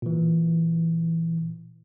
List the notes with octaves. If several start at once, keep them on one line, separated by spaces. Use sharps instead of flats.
A#2 E3